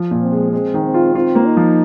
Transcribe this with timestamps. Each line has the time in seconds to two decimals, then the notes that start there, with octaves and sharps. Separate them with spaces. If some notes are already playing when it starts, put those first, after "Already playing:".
Already playing: F3
0.11 A#2
0.22 C4
0.32 G#3
0.53 G#3 C4
0.74 D#3
0.84 C4
0.94 F4
1.15 C4 F4
1.35 A#3
1.46 D#4
1.57 F3